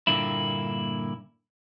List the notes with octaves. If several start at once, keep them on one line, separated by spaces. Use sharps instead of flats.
G2 A#2 D3 A#3 E4